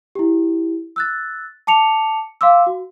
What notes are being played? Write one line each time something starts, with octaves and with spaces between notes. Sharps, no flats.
E4 G4
E6 F#6 A6
A5 D6 C#7 F7
F5 C6 D6 E6
F#4